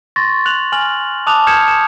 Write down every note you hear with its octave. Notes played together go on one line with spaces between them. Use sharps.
C6 C#6 A6 A#6
F#6 F7 F#7
G#5 F6 F#7
A5 D6 D#6 F#6 F7
D#6 F6 G6 G#6 C#7 E7
E7